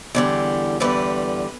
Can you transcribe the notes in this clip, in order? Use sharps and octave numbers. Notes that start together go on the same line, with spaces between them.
E2 D3 G3
E2 D3 G3 B4